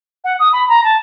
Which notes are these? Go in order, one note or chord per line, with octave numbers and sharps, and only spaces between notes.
F#5
D#6
B5
A#5
A5